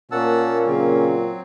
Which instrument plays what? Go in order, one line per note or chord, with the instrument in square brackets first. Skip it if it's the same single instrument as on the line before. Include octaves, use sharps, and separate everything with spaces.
[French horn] A#2 [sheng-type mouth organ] A#3 C#4 [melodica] F#5 A5 E6
[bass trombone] C#3 [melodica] F#3 C4